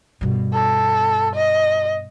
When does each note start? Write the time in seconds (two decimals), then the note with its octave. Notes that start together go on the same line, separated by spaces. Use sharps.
0.21 G2 B2
0.53 A4
1.35 D#5